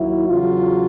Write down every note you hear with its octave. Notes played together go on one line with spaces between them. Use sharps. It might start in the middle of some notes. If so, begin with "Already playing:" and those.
Already playing: D#2 D#3 F#3 E4
E2 C#3 F#3 F4